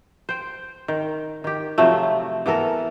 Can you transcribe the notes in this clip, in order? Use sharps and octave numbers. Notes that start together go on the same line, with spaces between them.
C5 G5
D#3
D#3 G4
C3 F3 F#3 A3
E3 B3 A4 A#4